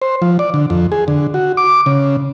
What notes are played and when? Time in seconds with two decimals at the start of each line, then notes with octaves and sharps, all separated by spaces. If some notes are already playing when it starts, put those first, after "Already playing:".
0.02 C5
0.22 F3
0.39 D5
0.54 D3
0.70 F2
0.92 G#4
1.08 D3
1.34 F#4
1.57 D6
1.86 C#3